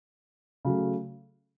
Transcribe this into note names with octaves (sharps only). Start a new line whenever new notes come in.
C#3 F#3 A3